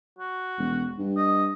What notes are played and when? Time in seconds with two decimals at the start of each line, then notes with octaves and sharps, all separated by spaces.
0.19 F#4
0.59 E1
0.98 G2
1.17 D#5